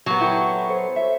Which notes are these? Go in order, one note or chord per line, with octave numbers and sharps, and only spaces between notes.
A#2 F#3 B3 G4
E4 G4 A4 C#5 C#6
A4 C5 C#5
E5